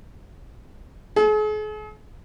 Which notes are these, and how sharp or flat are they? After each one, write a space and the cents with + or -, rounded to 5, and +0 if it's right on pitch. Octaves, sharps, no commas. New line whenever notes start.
G#4 +45